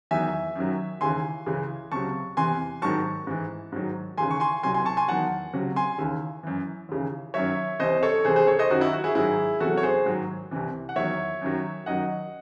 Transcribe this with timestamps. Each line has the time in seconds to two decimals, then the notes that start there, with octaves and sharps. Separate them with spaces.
0.11 E2 D#3 F#3 E5 G#5
0.56 F#2 D#3 F#3
1.01 D#2 C#3 E3 G#5 C6
1.46 C#2 C#3 E3
1.92 C#2 C3 F#3 A5 C#6
2.37 E2 C3 E3 G#5 C6
2.82 G#2 D#3 F#3 A5 C#6
3.27 G#2 E3
3.72 G#2 D#3 F#3
4.18 D#2 C#3 E3 G#5 C6
4.31 C#6
4.40 G#5 C6
4.63 C2 C3 F#3 G#5 C6
4.74 G#5 C6
4.85 A5 C#6
4.97 G#5 C6
5.08 E2 D#3 F#3 F#5 A5
5.53 C#2 C3 F#3
5.76 G#5 C6
5.98 D#2 C#3 E3
6.43 F#2 E3
6.89 D#2 C#3 E3
7.34 F#2 D#3 F#3 C#5 E5
7.80 C2 C3 E3 C5 D#5
8.03 A4 C#5
8.25 C2 C3 E3 G#4 C5
8.36 G#4 C5
8.47 A4 C#5
8.59 C5 D#5
8.70 F#2 D#3 F#3 F#4
8.81 E4
8.93 F#4
9.04 E4 G#4
9.15 G#2 D#3 F#3 E4 G#4
9.60 E2 C3 F#3 F#4 A4
9.77 C#5
9.83 G#4 C5
10.06 G#2 D#3 F#3
10.51 C2 C3 E3
10.89 F#5
10.96 E2 D#3 F#3 C#5 E5
11.41 F#2 D#3 F#3
11.86 F#2 D#3 F#3 D#5 F#5